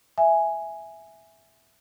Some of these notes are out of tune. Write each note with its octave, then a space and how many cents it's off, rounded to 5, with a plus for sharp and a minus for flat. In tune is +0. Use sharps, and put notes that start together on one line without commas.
E5 +0 G#5 +0